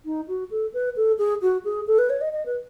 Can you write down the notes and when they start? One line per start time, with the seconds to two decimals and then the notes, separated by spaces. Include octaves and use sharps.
0.05 D#4
0.28 F#4
0.51 A4
0.74 B4
0.96 A4
1.19 G#4
1.42 F#4
1.65 G#4
1.87 A4
1.99 B4
2.10 C#5
2.21 D#5
2.33 D#5
2.46 B4